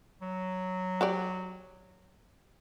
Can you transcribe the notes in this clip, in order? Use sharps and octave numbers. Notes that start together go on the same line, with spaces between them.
F#3
F#4 G4 D5